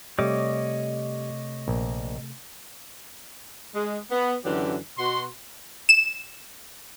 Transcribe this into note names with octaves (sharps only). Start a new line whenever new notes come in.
C3 G3 A3 C#5 D#5 D6
A#1
G#3
B3
F#2 D3 E3 F#3 C#4 G4
B2 F#4 C6
E7